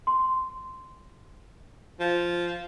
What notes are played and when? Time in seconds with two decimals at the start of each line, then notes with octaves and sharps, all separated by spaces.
0.07 C6
2.00 F3